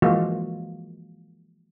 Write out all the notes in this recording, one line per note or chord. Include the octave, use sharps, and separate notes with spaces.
E3 F3 G#3 A#3 F4 F#4